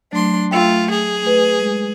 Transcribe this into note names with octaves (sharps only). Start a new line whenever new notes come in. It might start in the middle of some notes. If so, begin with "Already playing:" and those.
F#3 A3 D4 C6
A3 F4 G5 E6
G#4
A3 B4
G#3